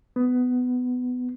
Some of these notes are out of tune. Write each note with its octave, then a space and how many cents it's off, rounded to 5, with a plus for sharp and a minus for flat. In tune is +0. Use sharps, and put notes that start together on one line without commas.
B3 +15